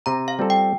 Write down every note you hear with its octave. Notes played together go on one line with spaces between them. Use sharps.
C3 A#5
F5
G3 C4 F4 A4
G5